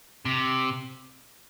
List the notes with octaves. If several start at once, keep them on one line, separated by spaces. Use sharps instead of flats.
C3